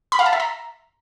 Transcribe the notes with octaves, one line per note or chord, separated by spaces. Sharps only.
B5
F5
A5
E5
A#5